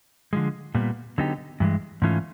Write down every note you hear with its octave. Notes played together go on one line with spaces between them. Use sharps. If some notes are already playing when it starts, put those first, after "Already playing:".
D3 F3 G#3
A#2 G3 B3
D3 F#3 B3 D#4 G4
G2 E3 G#3
G#2 E3 A3 C#4 F4